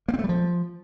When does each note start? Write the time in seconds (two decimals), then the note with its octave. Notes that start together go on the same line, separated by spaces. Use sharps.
0.08 A#3
0.14 C4
0.19 A3
0.24 G3
0.29 F3